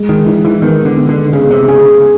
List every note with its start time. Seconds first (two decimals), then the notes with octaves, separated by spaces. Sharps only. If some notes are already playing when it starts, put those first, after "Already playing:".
Already playing: G#3
0.09 D#3
0.26 E3 D#4
0.45 E3
0.62 D#3 B3
0.85 D3
0.97 B3
1.09 D3
1.33 C#3 G#4
1.51 C3
1.68 C#3 G#4